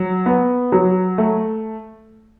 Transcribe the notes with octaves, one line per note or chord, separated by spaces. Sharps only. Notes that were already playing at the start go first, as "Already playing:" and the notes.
Already playing: F#3
B3
F#3
A3